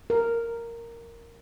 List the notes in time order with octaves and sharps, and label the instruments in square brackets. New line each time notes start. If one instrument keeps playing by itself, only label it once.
[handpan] A#4